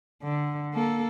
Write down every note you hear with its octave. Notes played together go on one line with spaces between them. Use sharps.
D3
A#3 A4